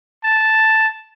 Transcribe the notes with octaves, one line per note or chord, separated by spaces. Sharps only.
A5